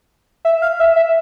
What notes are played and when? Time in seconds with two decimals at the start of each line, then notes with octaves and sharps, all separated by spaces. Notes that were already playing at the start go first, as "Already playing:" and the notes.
0.45 E5
0.62 F5
0.79 E5
0.96 E5